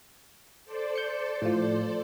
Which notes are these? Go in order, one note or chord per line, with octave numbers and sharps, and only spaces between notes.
A4 C5 D5
G6 C#7
A2 F3